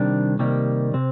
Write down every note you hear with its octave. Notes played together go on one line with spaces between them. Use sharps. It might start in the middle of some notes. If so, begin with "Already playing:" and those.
Already playing: C3 D#3 G3 D4
C3 D#3 G3 A#3
C3 C4